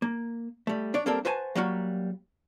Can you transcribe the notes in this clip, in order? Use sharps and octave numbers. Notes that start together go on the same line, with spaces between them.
A#3
G3 A3
D4 C#5 D5
G3 A#3 C4 D4 A4 A#4
F#4 B4 C5 G#5 A5
F#3 G3 A#3 F#4